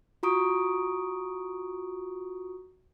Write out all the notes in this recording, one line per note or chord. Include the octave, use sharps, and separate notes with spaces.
F4 F#4 A#5 C#6 D#6 D7